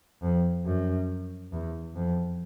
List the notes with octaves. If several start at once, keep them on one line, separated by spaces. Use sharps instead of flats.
F2
F#2
E2
F2